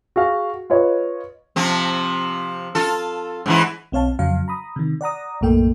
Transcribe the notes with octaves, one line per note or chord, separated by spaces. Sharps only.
F#4 G#4 F5
F4 B4 C#5 D#5
C3 F3 C4
F4 A4
G#2 E3 E4
B1 C4 C#5 F5 A5
F2 C#3 F#3 F5
A#5 B5 D#6
C3 D#3
D5 F#5 A#5 D#6
B1 F#2 A2 A#3 A4 G5